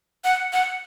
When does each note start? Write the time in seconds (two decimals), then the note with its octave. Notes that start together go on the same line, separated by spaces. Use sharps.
0.24 F#5
0.53 F#5